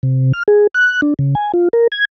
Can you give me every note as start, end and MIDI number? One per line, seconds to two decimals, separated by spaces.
0.03 0.32 48
0.33 0.43 89
0.48 0.67 68
0.74 1.01 90
1.02 1.14 62
1.19 1.35 49
1.35 1.52 80
1.54 1.68 65
1.73 1.87 70
1.92 2.05 92